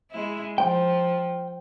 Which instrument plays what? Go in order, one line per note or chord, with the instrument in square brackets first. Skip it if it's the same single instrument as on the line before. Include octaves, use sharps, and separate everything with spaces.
[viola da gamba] G#3 E4
[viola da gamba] F3 [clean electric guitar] G5